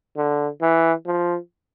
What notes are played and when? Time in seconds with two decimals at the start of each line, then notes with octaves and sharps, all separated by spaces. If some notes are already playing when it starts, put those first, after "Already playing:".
0.17 D3
0.62 E3
1.06 F3